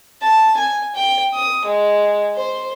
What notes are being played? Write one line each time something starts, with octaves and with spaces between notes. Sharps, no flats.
A5
G#5
G5
D#6
G#3
C5